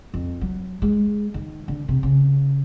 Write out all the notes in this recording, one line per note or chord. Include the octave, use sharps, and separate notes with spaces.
F2
F#3
G#3
D#3
D3
C3
C#3